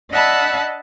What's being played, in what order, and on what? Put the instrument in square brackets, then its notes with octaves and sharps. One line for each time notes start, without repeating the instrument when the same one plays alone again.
[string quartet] D4 D#5 E5 F#5 A5 B5